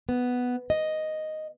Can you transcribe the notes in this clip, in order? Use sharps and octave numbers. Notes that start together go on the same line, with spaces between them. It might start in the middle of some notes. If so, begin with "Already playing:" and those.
B3
D#5